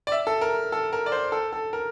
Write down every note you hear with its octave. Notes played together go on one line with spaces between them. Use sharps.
D5
E5
A4
A#4
A4
A#4
D5
C5
A4
A4
A#4